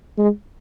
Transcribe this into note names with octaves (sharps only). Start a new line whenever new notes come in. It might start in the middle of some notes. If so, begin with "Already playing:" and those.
G#3